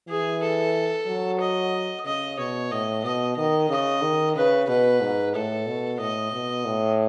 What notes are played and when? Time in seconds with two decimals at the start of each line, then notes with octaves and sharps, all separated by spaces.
0.08 E3 G#4
0.42 A4
1.07 F#3
1.40 D#5
2.05 C#3 D#5
2.38 B2 C#5
2.71 A2 D#5
3.03 B2 D#5
3.37 D#3 D#5
3.69 C#3 D#5
4.02 D#3
4.36 C#3 B4
4.69 B2 B4
5.01 G#2
5.34 A2 A4
5.67 B2
6.00 A2 D#5
6.32 B2
6.65 A2